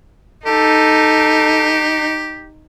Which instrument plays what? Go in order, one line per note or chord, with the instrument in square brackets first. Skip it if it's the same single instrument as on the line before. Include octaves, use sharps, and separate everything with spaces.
[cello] D#4 [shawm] G4 [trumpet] A4